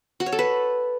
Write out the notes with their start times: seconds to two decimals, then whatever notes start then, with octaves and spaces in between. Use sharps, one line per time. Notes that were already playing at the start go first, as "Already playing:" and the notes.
0.20 F#4
0.26 C#5
0.32 A4
0.39 B4